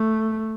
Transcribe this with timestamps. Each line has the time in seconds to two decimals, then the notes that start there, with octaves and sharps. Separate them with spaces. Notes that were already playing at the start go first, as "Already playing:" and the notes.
Already playing: A3